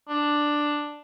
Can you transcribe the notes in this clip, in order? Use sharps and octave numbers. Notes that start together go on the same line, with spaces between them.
D4